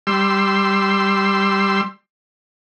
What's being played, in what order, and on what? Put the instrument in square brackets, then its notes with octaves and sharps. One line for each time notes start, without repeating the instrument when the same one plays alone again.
[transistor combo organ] G3 C6 E6